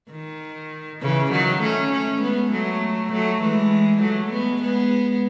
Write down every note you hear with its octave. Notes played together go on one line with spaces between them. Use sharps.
D#3
C#3 E3
D#3 F#3
A3 C#4
A3 C#4
G#3 B3
F#3 A3
F#3 A3
E3 G#3
F#3 A3
G#3 B3
G#3 B3